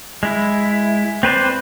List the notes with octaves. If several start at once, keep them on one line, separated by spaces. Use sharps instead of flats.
G#3 E4
C4 B4 C5 D5